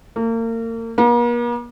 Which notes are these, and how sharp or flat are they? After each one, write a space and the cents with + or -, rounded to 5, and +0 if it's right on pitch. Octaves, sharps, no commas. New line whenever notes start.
A#3 -35
A#3 +45